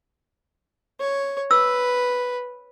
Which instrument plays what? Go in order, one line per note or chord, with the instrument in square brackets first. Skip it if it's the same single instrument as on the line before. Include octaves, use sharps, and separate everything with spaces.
[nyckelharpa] C#5
[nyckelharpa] B4 [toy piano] E6